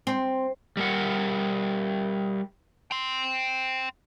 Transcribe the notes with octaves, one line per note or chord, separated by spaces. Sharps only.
C4
G3 A#4 F#5
G5 C6